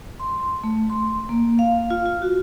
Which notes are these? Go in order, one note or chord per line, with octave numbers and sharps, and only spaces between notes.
C6
A3
C6
A#3
F5
F4
F4
F#4